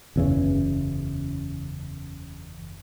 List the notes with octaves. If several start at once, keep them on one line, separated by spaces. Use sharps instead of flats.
F#1 E2 C#3